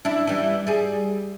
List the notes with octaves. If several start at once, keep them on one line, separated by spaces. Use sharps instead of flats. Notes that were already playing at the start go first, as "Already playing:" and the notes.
D4 E4
E3 G3
G3 G#4